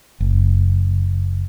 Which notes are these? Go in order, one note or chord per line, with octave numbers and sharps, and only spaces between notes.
F#1